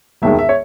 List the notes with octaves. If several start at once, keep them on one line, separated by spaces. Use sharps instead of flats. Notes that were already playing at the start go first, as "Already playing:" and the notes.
E1 D#2 D#3 G#3 E5
E5
C#5